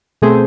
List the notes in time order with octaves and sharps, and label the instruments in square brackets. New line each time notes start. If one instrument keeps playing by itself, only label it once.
[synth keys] B2 A3 C4 G#4 C5